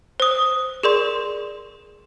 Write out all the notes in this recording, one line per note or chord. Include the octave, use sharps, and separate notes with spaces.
C5 D#6
G#4 A#4 D5 C6